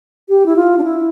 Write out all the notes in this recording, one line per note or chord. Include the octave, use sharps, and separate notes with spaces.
G4
E4
F4
D4
E4